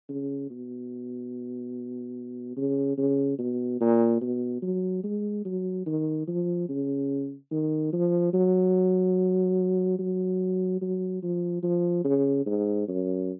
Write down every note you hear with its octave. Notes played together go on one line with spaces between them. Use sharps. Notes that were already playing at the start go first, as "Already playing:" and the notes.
C#3
B2
C#3
C#3
B2
A#2
B2
F#3
G#3
F#3
D#3
F3
C#3
D#3
F3
F#3
F#3
F#3
F3
F3
C#3
G#2
F#2